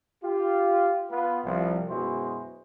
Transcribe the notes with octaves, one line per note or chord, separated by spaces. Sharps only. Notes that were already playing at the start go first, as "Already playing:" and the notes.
F4 G4
B3 F4 B4
C2 F3
F#2 B2 G#3 E4 F#4 C5